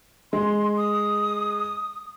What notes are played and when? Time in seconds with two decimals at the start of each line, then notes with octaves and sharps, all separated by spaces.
0.33 G#3 C6
0.78 D#6